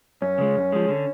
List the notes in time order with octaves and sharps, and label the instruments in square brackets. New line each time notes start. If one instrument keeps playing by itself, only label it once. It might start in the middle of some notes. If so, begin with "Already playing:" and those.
[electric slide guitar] F#2 [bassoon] C#4
[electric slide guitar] C#3 G#3
F#2
F3 G#3
D3